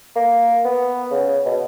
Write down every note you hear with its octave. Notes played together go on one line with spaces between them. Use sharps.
A#3
B3
C#3
B2